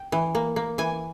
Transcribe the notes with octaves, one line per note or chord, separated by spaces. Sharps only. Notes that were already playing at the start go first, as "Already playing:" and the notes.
Already playing: G5
E3
A#3
A#3
E3 G#5